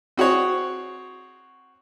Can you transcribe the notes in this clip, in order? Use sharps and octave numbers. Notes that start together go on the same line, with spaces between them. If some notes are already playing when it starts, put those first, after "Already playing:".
C4 F#4 G#4 C#5